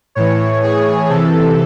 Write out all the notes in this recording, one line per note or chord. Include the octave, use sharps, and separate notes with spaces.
A2 E3 C#5
G#4
C3 E3 A4